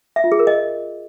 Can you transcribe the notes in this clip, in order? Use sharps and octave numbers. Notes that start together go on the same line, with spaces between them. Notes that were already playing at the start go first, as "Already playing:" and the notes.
E5
F4
G#4
A#4
D#5